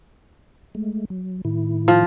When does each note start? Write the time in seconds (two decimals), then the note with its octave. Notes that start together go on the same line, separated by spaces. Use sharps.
0.75 G#3 A3
1.10 F#3
1.45 A2 D#3 E4
1.88 F3